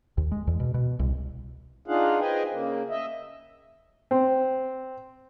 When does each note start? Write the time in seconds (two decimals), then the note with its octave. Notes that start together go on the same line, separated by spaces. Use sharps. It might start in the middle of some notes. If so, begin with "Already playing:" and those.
0.18 D#2
0.32 G#3
0.47 E2
0.60 B2
0.74 B2
0.99 C2
1.88 D4 D#4 F4 G#4 F5 F#5
2.20 G#4 B4 C5 D#5 G5 G#5
2.51 C#3 A#3
2.90 D#5 E5
4.11 C4